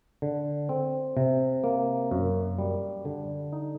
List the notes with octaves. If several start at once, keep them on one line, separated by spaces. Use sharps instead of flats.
D3
C4
C3
A#3
F#2
G3
D3
D#4